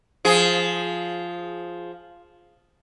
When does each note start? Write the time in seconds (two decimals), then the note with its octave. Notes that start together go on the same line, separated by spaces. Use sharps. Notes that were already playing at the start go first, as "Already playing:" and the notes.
0.25 F3 G#4